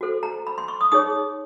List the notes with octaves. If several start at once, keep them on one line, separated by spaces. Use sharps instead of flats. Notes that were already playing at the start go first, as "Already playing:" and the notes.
F#4 A4 C5
A#5
B5
C6
C#6
D#6
D#4 G#4 C#5 D#6